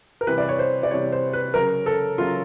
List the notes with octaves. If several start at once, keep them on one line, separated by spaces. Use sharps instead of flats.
A#4
C3 E3 G3 B4
D5
C#5
C5
D5
C3 E3 G3 C#5
C5
B4
C#3 F#3 A#4
A4
C#3 F#3 F4